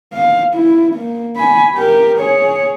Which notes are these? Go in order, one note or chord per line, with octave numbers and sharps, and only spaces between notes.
F5
E4
A#3
G#5 B5
G4 A#4
G#4 C#5